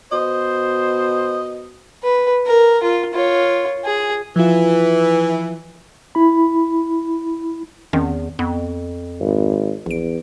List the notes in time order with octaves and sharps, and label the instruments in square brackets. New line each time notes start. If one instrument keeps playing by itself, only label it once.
[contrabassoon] B2 [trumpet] C5 [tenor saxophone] D#5
[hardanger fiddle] B4
A#4
F4
F4 C#5
G#4
[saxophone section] E3 [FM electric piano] F3 F4
[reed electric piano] E4 B5
[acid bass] E2 [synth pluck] D#3 C4 C#4
[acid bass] F2 [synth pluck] B3
[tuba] G#1
[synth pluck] A#1 D7 [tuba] E2